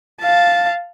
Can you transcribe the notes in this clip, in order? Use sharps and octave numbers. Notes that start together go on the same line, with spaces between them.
F5 A5